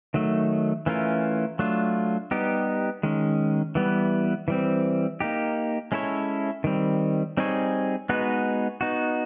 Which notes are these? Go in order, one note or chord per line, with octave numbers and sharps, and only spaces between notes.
D#3 F#3 A3
E3 A3 C#4 F4 A#4
F#3 A3 D4 F4
G3 B3 D#4 G4
D#3 G#3 C#4
E3 G3 B3
E3 G3 C4
A#3 D#4 G4
G#3 C#4 E4 A4 C#5
D#3 G3 C4
G3 C4 D#4 G#4 C#5
G#3 B3 D#4 F#4 B4
B3 D#4 F#4